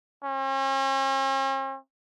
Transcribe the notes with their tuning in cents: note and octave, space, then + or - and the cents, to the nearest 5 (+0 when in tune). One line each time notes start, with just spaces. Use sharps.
C#4 -45